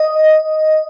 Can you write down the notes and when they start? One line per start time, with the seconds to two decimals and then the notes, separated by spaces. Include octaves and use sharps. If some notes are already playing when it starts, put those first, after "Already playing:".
Already playing: D#5